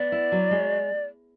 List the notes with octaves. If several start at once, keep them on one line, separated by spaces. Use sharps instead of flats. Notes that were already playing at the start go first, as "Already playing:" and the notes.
Already playing: B3 D5
E4
F#3
G#3